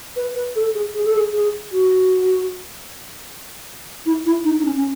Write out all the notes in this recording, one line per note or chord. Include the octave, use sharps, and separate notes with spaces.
B4
B4
A4
G#4
G#4
A4
G#4
G#4
F#4
E4
E4
D#4
D#4
C#4
C#4